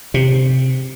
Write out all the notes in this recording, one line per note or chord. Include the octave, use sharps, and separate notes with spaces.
C3